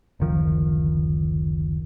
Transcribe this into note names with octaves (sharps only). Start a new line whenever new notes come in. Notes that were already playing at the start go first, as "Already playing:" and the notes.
F#1 D2 D#3 F3